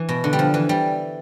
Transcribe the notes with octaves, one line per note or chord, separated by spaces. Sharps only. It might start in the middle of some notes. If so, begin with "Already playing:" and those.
Already playing: E3
B2
D3
G3
F3
E3
G3